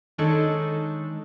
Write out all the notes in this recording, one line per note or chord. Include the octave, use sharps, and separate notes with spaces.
D#3 G#3 D4 D#4 A4 C#5